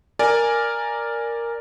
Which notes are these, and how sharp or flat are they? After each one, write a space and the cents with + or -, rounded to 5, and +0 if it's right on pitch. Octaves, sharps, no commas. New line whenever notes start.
A#4 +0 D5 +0 G#5 +0